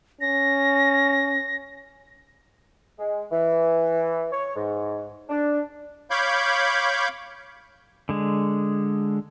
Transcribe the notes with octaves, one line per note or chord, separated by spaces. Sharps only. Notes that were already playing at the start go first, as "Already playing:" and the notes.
C#4 A#6
G#3
E3
C#5
G#2
D4
C#5 F5 B5 C#6 D6 G6
D3 G#3